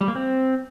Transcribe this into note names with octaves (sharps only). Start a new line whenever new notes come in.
G3
A#3
C4